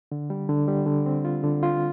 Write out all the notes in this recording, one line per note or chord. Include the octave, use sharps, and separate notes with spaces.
D3
G3
D3
G3
D3
C4
F4
D3
F4